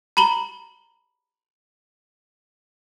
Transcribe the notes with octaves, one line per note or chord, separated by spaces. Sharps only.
A#5 B5 F#7 G7